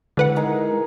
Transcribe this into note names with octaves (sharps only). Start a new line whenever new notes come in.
D3 G#3 E4 B4 F#5
D#4 G#4 A#4